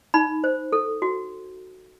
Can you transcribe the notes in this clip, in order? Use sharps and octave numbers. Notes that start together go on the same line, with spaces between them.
D#4 B5
C5
A4
F#4